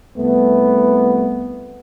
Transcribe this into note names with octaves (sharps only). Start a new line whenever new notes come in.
C2 A3 B3